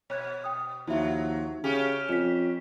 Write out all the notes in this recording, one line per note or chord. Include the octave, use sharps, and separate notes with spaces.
B2 C#5 F#6 G#6
G5 D#6
D#2 F3 F#3 E4 F#4 E5
C#3 C#4 G4
F2 B6 E7